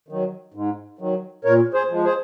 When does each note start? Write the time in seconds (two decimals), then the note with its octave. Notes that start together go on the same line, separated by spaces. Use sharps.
0.08 D#3 F#3
0.54 G#2
0.99 D#3 F#3
1.45 A#2 A#4 C#5
1.74 G#4 C5
1.89 F3 G#3
2.04 G#4 C5